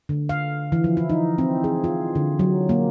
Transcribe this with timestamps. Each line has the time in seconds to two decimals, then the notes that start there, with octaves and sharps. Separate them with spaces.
0.09 D3
0.29 F5
0.72 E3
0.84 F3
0.97 E4
1.10 D#4
1.38 C4
1.64 G#4
1.84 F4
2.15 D3
2.39 F#3
2.69 A#3